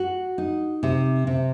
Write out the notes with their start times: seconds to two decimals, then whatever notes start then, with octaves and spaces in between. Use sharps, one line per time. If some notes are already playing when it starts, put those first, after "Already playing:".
Already playing: F#4
0.38 D#4
0.83 C3
1.27 C3